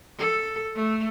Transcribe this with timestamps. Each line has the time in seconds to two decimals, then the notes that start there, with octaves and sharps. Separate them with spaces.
0.18 A4
0.75 A3